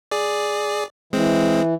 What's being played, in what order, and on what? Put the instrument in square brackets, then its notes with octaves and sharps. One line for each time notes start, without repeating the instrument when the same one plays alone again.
[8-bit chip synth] G#4 D5
[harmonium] E3 [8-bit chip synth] G#3 C4